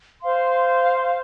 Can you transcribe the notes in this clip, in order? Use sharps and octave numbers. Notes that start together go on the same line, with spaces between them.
C5 F5 C6